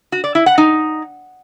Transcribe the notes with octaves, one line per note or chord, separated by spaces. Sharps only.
F#4
D5
E4
F#5
D#4